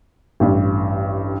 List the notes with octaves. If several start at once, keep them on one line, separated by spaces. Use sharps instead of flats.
A1 G2